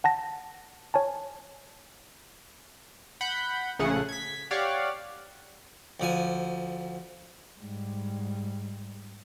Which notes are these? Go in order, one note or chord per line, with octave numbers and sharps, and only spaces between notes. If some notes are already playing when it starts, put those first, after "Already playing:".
F#5 A5 A#6
C#5 G#5 A5
F#5 B5 G6
A#1 C#3 A3 G#4 F#5
G#6 B6
G4 C#5 D5 F5 F#5
D2 F3 G#5
G#2 G3